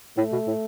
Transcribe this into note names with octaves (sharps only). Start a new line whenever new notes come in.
A2 A3
B2
A2